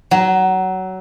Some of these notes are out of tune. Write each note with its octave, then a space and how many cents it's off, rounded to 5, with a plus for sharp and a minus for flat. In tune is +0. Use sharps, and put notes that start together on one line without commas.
F#3 +20